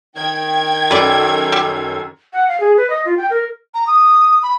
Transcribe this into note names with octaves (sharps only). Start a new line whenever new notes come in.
D#3 G5 G#6
F#2 A4 B4 D5
G3
F#5
F5
G#4
B4
D#5
F4
G5
A#4
A#5
D#6
B5